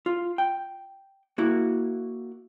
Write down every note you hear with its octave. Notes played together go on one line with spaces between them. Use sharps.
F4
G5
A#3 E4 F#4